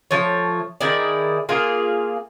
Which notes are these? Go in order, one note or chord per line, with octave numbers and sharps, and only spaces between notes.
F3 A3 C#5
D#3 E4 G#4 D5
A#3 F4 G#4